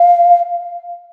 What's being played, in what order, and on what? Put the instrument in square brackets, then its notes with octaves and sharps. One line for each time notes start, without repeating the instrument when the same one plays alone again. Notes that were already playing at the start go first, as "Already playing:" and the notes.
Already playing: [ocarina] F5